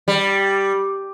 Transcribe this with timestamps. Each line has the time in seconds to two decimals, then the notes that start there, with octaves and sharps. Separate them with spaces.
0.08 G3